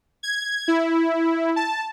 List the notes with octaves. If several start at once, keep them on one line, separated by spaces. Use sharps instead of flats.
G#6
E4
A5